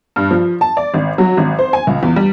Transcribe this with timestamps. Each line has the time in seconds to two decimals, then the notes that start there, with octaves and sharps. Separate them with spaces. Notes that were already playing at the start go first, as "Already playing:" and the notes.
0.16 G2
0.31 F3
0.61 A5
0.77 D5
0.94 G#1
1.18 F#3
1.37 G#1
1.59 C5
1.73 G#5
1.87 C#2
2.03 E2
2.16 G3